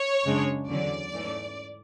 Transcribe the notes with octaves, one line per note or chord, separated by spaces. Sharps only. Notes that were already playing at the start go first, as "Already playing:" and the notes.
Already playing: C#5
F#2 C#3 G#3 D4
E2 D3 F#3 C#4 D5
G#2 E3 A3 C#4